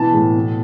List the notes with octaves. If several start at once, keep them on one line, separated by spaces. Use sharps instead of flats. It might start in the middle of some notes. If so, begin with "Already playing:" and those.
Already playing: B2 E3 A5
A2
B2